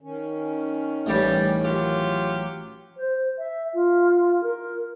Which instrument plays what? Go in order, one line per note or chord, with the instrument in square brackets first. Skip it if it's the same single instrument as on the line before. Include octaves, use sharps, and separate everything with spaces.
[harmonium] D#3 C#4
[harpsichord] A1 A2 E3 [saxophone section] G3
[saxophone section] F#3 F4 G4
[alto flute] C5
E5
F4
A#4